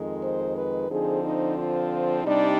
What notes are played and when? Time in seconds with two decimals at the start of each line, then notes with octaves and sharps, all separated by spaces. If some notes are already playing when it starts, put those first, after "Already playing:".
Already playing: F2 D#3 G#3
0.22 C5
0.55 B4
0.89 D3 F3 C4 D#4 G#4
1.23 D#4
1.57 F4
2.24 C3 G3 D4 D#4